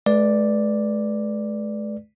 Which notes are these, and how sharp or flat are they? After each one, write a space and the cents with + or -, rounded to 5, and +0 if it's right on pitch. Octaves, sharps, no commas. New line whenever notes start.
G#3 +45 B4 -15 D5 +0